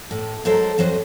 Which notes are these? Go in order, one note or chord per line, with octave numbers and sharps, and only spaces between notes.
A2
G#2 F#3 A4 A#4 C5
F2 F#3 F#4 C5 D#5